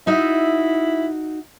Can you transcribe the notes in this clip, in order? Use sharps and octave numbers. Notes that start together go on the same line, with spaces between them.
D#4 E4 F#4 E5